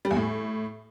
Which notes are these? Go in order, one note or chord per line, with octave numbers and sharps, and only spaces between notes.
G3
E2
A2